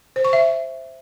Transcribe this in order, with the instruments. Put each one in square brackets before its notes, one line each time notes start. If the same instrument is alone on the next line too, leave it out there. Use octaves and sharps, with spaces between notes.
[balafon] C5
C#6
E5